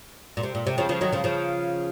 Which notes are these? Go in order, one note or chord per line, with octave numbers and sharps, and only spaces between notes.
A#2
C3
A#2
C3
C#3 F3
C#3 F3
D#3 F#3
C#3 F3
C#3 F3